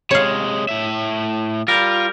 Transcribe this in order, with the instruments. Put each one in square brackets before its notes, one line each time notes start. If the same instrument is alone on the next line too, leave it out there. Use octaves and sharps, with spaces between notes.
[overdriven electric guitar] C3 G#3 [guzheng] C#5 F5
[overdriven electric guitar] A2 E5
[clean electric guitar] G3 A#4 [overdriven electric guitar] F4